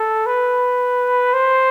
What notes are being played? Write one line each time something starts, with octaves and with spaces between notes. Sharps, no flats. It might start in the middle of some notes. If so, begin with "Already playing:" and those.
Already playing: A4
B4
C5